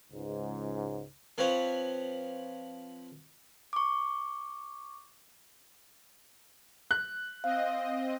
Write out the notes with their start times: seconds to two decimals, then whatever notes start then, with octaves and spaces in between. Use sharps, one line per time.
0.11 C#2 G#2
1.38 F3 C4 B4 C#5
3.73 C#6 D6
6.91 F#6
7.44 C4 D#5 F5